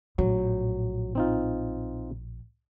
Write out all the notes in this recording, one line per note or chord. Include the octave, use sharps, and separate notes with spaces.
A#1 A2 F#3
C4 D#4 F4